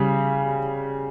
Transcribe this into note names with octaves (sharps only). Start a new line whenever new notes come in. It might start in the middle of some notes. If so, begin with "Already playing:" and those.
Already playing: C#3 G3